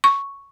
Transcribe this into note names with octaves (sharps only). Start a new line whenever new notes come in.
C#6